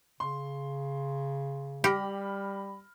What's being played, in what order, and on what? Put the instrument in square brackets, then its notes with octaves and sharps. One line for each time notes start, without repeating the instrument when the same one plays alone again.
[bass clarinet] C#3 [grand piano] C6
[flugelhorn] G3 [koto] G4 [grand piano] B5 F6 A#6